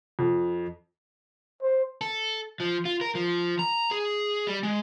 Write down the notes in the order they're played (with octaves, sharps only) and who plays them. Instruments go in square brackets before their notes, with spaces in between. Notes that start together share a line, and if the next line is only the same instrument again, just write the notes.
[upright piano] F2
[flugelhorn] C5
[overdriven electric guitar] A4
F3
F4
A#4
F3
A#5
G#4
G3
G#3